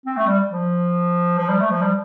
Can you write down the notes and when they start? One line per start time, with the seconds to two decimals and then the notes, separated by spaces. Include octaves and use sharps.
0.06 C4
0.17 A3
0.27 G3
0.50 F3
1.38 F3
1.49 G3
1.60 A3
1.70 F3
1.82 G3